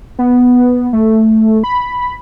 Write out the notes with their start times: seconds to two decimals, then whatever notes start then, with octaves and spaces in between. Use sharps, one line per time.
0.19 B3
0.93 A3
1.64 B5